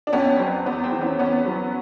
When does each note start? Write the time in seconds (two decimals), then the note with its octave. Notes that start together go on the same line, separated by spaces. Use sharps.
0.07 D4
0.13 F2 B3 C#4
0.40 F#3 C4
0.66 E2 B3
0.84 C4
0.92 E3
1.01 B3 C#4
1.19 E2 B3 C#4
1.46 F#3